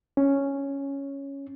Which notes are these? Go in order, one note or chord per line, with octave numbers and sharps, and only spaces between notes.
C#4